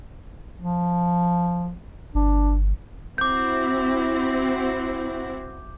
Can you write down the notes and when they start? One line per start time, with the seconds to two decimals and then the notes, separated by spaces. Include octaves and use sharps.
0.58 F3
2.15 G1 D4
3.18 C4 E4 F#4 D6 G6